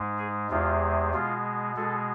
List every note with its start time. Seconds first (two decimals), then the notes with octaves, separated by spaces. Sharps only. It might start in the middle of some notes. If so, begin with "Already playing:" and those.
Already playing: G#2 G#3
0.18 G#4
0.50 E2 C3 G#3 F4
1.13 B2 G#3 F4
1.76 B2 G#3 A4